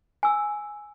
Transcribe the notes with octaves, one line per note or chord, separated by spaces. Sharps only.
G#5 E6